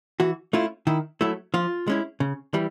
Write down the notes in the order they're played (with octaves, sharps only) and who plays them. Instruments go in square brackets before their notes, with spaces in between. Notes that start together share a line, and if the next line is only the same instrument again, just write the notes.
[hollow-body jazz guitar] E3 F#4
A3 C#4 E4 F4
D#3 E4
F#3 A3 E4
F3 F4
G#3 C#4 E4
C#3
E3 G3